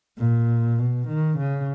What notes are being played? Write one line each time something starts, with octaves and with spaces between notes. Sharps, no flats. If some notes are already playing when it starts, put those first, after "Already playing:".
A#2
B2
D#3
C#3